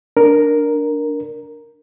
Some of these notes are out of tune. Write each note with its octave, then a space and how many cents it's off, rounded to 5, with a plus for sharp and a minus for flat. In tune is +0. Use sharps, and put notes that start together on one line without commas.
D4 +0 A#4 +0